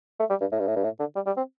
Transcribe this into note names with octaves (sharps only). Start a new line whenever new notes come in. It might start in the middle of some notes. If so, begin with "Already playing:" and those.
A3
G3
G2
A2
G2
A2
G2
A2
D3
G3
G3
C4